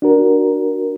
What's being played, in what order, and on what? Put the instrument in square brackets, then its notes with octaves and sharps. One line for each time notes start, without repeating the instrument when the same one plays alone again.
[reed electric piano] D4 F#4 A#4